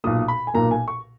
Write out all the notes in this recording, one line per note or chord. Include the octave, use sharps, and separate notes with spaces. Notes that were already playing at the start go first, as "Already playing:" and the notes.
B1 A#2 A#3 D#6
B5
G#5
B1 A#2 A#3 A#5
G#5
C#6